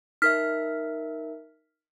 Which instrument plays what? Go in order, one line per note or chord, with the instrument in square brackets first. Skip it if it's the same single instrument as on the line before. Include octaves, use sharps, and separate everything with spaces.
[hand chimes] D#4 A#4 E5 [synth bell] F6 B6